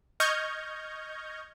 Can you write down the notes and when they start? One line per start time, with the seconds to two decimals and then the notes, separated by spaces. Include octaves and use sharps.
0.20 D#5 C#6 F6 G6 G#6 A#6